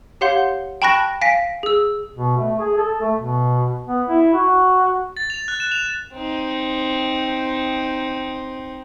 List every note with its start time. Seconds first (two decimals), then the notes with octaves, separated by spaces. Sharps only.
0.21 G4 C#5 F5 F#5 C6 G6
0.82 G5 A5 B5 C#6 F#6 A#6
1.21 F5 G#5 A#6 B6 D7
1.63 G#4 E6
2.15 B2
2.37 A3
2.59 G#4
2.77 A4
3.01 A3
3.17 B2
3.87 B3
4.09 E4
4.34 F#4
5.17 A6
5.30 F7
5.48 F#6
5.60 E7
5.72 F7
6.13 C4 D#4